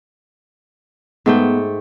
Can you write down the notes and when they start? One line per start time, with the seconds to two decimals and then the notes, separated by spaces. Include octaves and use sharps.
1.26 G#2 A3 B3 G5